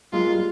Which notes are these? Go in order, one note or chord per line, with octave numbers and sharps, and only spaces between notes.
G#3 A#3 F4
G3